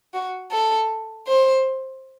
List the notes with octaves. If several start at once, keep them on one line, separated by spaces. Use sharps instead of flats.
F#4
A4
C5